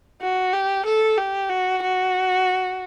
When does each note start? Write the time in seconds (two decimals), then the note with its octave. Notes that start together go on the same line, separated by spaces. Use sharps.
0.21 F#4
0.53 G4
0.86 A4
1.18 G4
1.50 F#4
1.82 F#4